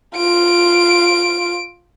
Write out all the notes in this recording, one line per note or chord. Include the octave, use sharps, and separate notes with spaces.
F4 D7